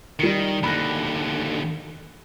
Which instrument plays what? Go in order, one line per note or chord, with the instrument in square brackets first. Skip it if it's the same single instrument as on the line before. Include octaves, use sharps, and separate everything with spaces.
[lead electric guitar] D#3 [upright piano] G3 C#7
[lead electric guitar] D#2 D3 [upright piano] B5 F#6 A#6